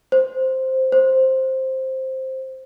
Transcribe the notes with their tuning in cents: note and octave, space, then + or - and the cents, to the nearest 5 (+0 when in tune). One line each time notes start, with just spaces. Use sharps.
C5 +0
C5 +5